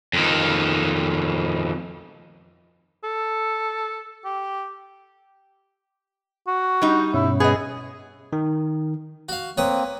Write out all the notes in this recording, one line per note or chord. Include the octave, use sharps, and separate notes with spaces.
F2 D#3
A4
G4
F#4
G3 D#4
G2 B2 C#4 E4
B3 G#4 D#5
D#3
F#4 F5
A#3 C4 B4 C#5 D#6